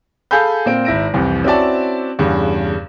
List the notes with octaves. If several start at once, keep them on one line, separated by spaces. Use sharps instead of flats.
G#4 A4 F5 G#5 B5 G6
A#2 A#3 C4 D7
G#1 E4 A#6 D7
C2 F2 E3
C4 C#4 E4 F#4 D5 A5
E2 G2 C#3